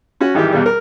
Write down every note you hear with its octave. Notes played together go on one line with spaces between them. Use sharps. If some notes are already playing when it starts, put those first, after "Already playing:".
C#4 F#4
G#1 D#3 E3 G3 G4
E2 B2 G3
A#4